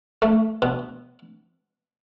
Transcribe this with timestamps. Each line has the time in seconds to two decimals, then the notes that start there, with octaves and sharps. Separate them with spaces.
0.22 A3
0.62 B2